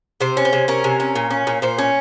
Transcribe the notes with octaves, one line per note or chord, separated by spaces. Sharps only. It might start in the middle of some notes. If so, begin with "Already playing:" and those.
C3 C5
C#4
C5
C3
C#4 A#4
C3
C#4
A#2
C#4
A#2
A#2 C5
C#4